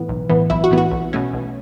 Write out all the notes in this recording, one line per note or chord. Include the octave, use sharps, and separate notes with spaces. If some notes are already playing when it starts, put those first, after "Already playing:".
Already playing: A2 E3 B3
B1
A2 E3 B3
B1 E4
F#4
A2 E3 B3
F#4
B1
B2 A3 C#4
B1